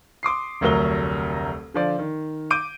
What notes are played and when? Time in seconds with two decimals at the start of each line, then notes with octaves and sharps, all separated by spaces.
0.23 C6 D6 D#6 C7
0.61 F1 D2 F#3 A#4 G7
1.74 D3 F3 D5
1.99 D#3
2.51 D6 G6 D7 D#7